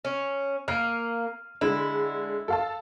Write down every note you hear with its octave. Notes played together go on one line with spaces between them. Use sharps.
C#4
A#3 F6 C7 D#7
D3 G#3 E4
A4 F5 A5